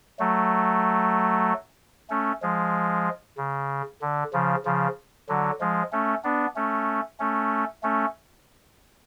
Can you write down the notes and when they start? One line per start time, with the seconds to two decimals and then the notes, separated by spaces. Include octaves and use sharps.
0.19 F#3 A3
2.10 A3 C#4
2.42 F3 G#3
3.38 C#3
4.01 D3
4.33 C#3 F3
4.65 C#3 F3
5.29 D3 F#3
5.60 F3 G#3
5.92 A3 C#4
6.24 B3 D4
6.56 A3 C#4
7.20 A3 C#4
7.83 A3 C#4